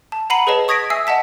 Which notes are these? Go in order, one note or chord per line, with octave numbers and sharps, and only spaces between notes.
A5
F#5 A#5 B5 C7 D#7 F#7
G#4 B4 C#5 D#5 A5
C#6 D#6 G#6 A#6 B6 D7
E5 G#5 E6 C7
D#5 F#5 A5 B6